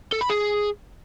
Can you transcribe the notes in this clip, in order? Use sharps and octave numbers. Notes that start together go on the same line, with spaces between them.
A4
B5
G#4